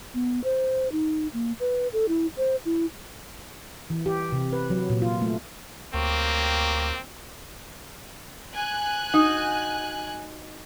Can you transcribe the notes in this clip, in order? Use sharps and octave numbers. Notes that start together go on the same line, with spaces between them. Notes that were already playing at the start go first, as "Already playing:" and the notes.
B3
C5
D#4
A#3
B4
A4
E4
C5
E4
E3
G4
C3
B4
F#3
A#2
F4
A3
D2 A#3 C4 G4 C#5
G#5 F#6
D#4 F#4